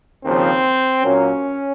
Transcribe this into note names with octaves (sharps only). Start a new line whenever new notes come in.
D#2 C#3 F3 C4
A#2 F#3 A#3 C#4